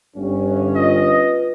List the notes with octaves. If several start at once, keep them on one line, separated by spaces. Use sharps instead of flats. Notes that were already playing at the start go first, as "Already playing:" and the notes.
G1 G2 C#4
F4 B4 D#5